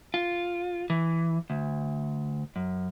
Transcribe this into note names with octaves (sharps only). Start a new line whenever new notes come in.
F4
E3
D2
F#2